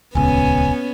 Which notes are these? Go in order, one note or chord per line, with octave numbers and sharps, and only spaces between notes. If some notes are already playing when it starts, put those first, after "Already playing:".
D#1 C#2 B3 C#4 G#5